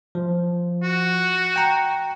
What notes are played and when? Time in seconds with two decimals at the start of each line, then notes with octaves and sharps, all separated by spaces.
0.15 F3
0.83 F#4
1.56 G5 A#5